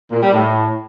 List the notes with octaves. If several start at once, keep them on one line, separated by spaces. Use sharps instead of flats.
A#2
G3
A2